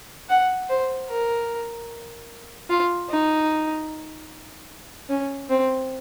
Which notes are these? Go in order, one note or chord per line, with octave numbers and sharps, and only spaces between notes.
F#5
C5
A#4
F4
D#4
C#4
C4